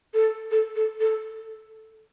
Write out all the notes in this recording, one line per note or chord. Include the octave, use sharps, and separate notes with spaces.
A4
A4
A4
A4